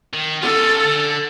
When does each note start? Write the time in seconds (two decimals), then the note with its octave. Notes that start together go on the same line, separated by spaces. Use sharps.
0.13 D#3
0.42 C#4 F4 A4
0.85 D3